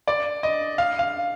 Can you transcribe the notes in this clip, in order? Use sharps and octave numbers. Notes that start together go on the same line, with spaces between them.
D5
D#5
F5
F5